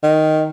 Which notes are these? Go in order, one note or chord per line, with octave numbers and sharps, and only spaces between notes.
D#3